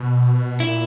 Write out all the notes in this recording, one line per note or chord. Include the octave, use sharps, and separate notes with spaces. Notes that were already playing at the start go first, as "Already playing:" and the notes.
Already playing: B2
A#2 E4